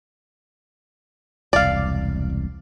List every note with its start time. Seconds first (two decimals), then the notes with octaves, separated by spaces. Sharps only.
1.53 E1 C2 D5 F5